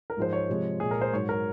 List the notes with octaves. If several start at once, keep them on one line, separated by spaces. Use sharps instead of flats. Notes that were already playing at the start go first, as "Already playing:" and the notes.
A#4
G#2 F3 G#3 C5
C#5
C3 F3 G#3
A#2 G#3 G#4
A#4
C5
G#2 F#3 C#5
A#4